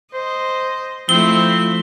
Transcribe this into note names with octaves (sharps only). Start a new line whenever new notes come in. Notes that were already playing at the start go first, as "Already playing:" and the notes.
C5 D#5
F3 A3 C4 E4 G7